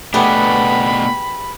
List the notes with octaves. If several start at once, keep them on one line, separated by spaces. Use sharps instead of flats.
B2 A3 D4 G4 G#4 B4 F#5 B5